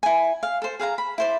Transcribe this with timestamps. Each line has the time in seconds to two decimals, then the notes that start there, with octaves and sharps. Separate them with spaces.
0.03 E4 G#5
0.43 F5
0.62 A4 C5
0.80 G#4 F5 F#5 A#5
0.98 B5
1.18 E4 C5 D5